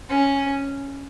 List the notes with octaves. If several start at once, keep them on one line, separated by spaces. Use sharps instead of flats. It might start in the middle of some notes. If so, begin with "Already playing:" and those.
C#4